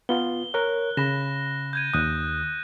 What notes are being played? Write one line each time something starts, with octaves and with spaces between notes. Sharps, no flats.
B3 F4 G7
A#4 C#5 F#6
C#3 B5 A#6 E7
G6 G#6 D#7
D#2 D#6 F#6